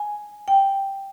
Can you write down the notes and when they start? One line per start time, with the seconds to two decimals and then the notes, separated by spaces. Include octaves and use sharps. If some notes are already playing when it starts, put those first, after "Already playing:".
Already playing: G#5
0.48 G5